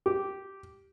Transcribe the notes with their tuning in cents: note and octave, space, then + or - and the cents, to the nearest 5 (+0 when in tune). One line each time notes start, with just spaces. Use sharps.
G4 -10